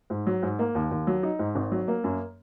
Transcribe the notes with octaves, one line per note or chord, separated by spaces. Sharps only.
G#2
F#3
G#2
A#3
D#2
D#2
F#3
D#4
G#2
G#1
F#3
A#3
F#2